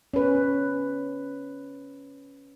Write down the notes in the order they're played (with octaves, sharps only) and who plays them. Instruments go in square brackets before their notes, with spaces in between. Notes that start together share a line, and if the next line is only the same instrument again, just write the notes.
[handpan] C#4 B4